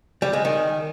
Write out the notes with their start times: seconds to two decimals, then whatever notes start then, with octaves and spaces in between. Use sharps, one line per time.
0.22 G3
0.33 G#3
0.45 D#3